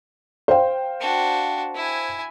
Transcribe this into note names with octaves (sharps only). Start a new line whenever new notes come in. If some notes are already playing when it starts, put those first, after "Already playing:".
C5 F5 G5
D4 F#4
E4 G#5